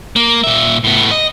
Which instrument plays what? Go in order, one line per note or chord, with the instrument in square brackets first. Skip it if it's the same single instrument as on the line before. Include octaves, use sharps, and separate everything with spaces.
[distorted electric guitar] A#3
A#2 E5
A2 B3
D#5